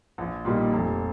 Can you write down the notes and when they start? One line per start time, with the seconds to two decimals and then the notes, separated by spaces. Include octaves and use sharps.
0.18 A#1
0.45 A#2 G3 A#3 D#4
0.71 F1